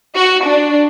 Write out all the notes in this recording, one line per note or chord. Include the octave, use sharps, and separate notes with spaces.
F#4
D4